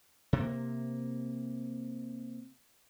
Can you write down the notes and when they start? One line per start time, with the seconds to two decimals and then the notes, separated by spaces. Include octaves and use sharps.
0.33 C3 A#3